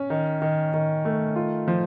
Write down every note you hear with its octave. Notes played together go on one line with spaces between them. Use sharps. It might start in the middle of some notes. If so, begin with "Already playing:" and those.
Already playing: C#4
D#3
D#3
D#3
A3
F4
F3